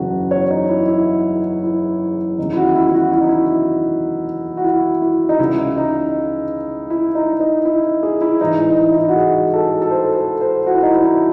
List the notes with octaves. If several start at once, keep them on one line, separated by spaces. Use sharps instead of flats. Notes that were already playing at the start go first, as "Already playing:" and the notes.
Already playing: F#1 E2 C#3 E3 F#4
C#5
D#4
E4
E4
E4
E1 D#2 C#3 D#4
E4
F#4
E4
E4
F#4
E4
D#4
E4
F#4
E4
E4
D#4
C#2 C#3 E3 E4
D#4
E4
D#4
D#4
E4
G#4
E4
A1 G#2 E3 D#4
E4
D#4
E4
D#4
E4
F#4
G#4
A4
A4
C5
A4
C5
F#4
E4
D#4
E4
D#4